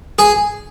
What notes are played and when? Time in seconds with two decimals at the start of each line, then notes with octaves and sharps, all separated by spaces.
0.19 G#4